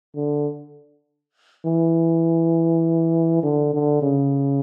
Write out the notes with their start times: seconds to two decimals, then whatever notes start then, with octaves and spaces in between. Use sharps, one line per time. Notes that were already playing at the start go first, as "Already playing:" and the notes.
0.16 D3
1.66 E3
3.43 D3
3.73 D3
4.02 C#3